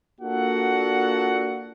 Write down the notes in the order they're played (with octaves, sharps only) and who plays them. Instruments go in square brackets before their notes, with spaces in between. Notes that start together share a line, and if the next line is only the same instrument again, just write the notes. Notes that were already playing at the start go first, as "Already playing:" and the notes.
[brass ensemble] A#3 D4 F4 F#4 A4 F#5